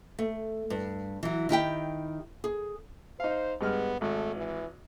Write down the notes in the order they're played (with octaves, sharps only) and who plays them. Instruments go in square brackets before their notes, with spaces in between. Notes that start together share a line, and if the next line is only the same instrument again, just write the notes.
[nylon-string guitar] A3
G2
E3 F#3
D#3 E4 G4 G5
G#4
[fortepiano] D#4 F5 [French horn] C5
[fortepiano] G2 G#3 F6 [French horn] B3
[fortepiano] G#1 [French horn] A3
[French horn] E3